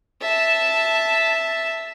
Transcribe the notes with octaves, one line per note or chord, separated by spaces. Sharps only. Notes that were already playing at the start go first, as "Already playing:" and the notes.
E5 A5